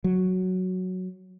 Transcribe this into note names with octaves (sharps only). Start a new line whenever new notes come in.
F#3